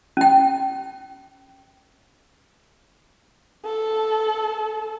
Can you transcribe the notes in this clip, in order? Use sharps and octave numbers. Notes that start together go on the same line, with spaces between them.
C#4 G5
A4